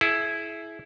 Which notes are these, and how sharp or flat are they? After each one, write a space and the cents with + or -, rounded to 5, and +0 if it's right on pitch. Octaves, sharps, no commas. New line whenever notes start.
E4 +0 G#4 +40